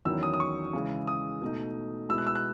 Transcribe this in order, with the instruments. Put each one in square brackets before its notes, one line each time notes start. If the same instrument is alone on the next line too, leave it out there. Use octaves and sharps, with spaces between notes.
[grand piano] E2 D#3 F#3 C#4 E4 E6
D#6
D#6
C#6
C#3 E3 G#3
D#6
B2 A3 D#4
B2 G#3 B3 E4 E6
F#6
E6
F#6